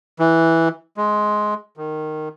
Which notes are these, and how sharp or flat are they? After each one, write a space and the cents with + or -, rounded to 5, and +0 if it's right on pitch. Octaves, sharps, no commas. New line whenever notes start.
E3 -5
G#3 +15
D#3 -15